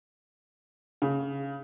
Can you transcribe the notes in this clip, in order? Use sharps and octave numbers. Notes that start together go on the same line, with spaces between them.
C#3